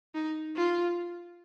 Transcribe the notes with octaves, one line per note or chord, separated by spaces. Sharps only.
D#4
F4